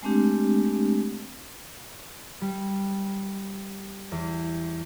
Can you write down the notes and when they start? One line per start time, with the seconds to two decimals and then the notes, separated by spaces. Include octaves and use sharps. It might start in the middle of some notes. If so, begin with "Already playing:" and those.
0.03 G#3 A3 C4 D4 G4
2.41 G3
4.12 E2